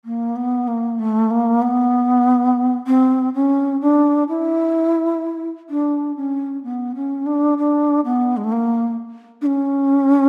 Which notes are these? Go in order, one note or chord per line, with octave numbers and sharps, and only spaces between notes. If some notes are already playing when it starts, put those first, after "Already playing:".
A#3
B3
A#3
A3
A#3
B3
C4
C#4
D4
E4
D4
C#4
B3
C#4
D4
D4
B3
G#3
A3
A#3
D4
C#4